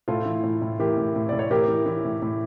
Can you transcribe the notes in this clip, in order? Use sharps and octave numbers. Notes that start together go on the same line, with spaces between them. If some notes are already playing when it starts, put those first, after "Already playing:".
A2 F4 A4
E3
A2
A2
E3 G4 A#4
A2
A2
A2 D5
C#5
E3 G4 A#4
E3
E3
A2
A2